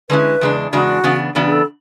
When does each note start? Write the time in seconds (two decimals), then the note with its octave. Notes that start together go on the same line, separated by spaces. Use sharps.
0.09 D3 G#3 C#4 E4 B4
0.41 E2 C#3 G#3 D4
0.73 E2 C#3 G#3 D4 F#4
1.04 C#3 E3 B3 D4
1.35 C#3 E3 B3 D4 F#4
1.47 G#4
1.52 A4